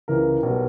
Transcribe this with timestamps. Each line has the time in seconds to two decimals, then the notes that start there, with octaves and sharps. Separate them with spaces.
0.08 C#2 C#3 E3 A#4
0.43 B1 B2 G3